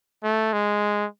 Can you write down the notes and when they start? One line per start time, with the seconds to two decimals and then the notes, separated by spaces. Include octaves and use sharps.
0.24 A3
0.53 G#3